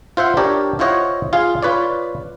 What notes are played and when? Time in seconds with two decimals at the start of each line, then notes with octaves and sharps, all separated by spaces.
0.17 F4 C5 E5 F#5
0.37 D4 G4 A#4 C#5 D5
0.79 E4 F4 C5 C#5 D#5 F#5
1.33 F4 G#4 F5
1.62 F4 B4 C#5 D5